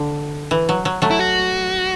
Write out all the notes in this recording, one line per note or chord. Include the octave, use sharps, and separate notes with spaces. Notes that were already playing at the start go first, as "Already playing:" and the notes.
Already playing: D3
E3
F#3
F#3
F#3 A3
E4
F#4